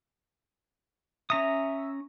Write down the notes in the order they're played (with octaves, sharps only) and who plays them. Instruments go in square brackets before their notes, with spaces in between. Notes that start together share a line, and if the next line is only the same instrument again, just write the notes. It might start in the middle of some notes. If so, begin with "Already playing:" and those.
[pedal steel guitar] C#4 A#5 D#6 [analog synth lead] E5